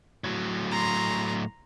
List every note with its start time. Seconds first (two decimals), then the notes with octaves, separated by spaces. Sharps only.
0.24 A2 F#3
0.72 A#5 C6